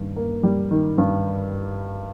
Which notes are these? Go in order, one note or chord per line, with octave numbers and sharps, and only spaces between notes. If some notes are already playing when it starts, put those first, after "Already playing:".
Already playing: G2 D#3
A#3
G3
D#3
G2